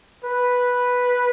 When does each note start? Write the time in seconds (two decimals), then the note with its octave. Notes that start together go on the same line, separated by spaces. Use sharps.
0.25 B4